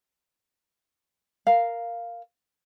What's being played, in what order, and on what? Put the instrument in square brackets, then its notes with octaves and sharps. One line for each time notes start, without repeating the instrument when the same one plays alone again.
[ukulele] A#4 F5